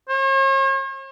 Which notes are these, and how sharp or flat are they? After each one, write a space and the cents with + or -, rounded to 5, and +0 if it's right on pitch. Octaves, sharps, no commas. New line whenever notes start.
C#5 -45